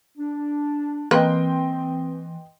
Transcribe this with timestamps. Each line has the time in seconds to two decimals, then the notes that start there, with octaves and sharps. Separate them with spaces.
0.18 D4
1.11 E3 A#3 C4 B4 D#5 G5 C6